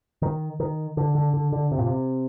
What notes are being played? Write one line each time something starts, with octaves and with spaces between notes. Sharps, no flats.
D#3
D#3
D3
D3
D3
D3
C3
A#2
C3